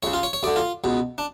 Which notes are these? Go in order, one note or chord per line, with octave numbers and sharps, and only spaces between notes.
C#2 C#3 C#5
F4
C#5
C#5
D2 D3 D5
F4
C#2 B2
D4